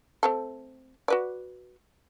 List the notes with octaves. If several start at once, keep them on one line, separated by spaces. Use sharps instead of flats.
A3 C4 A4
F#4 B4 D5